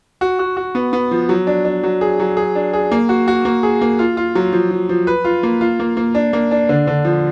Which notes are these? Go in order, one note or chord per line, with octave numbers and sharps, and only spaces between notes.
F#4
F#4
F#4
B3
B3
F3
F#3
D4
D4
F#3
G#4
F#3
G#4
D4
G#4
A#3
F#4
F#4
A#3
G#4
A#3
F4
F4
F#3
F3
F3
F3
B4
F4
A#3
F4
A#3
A#3
D4
A#3
D4
D3
D3
F3